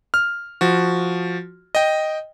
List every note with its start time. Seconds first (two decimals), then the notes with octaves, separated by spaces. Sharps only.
0.14 F6
0.61 F3 F#4
1.75 D#5 G5